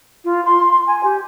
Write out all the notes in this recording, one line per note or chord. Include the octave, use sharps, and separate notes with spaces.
F4
C6
G#5
G4